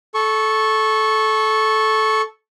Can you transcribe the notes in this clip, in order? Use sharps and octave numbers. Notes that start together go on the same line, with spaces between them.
A4 C#6